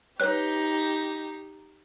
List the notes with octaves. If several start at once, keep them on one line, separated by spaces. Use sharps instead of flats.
D#4 G4 B4 C#5 F#6